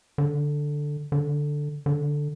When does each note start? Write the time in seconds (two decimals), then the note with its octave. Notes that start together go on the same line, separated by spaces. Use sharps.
0.18 D3
1.12 D3
1.86 D3